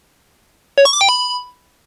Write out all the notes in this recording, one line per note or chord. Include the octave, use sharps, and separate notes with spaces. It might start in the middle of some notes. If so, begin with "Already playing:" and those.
C#5
C#6
D6
G5
B5